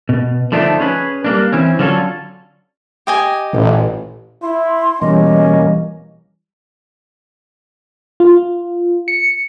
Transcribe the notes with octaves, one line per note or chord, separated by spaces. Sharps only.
B2
D3 F3 A3 B3 D4 D#4
C#4 G#4 B4
G3 A#3 D4
E3 C4 C#4
D3 F#3 C#4 F4 A4
G4 D#5 G#5
A1 A#2
E4 C6
B2 E3 G3 A#3 C#4 D#5
F4
C#7